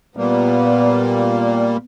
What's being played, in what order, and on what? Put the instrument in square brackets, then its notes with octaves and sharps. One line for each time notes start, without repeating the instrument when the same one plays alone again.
[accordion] A#2 G3 A#3 [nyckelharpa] B3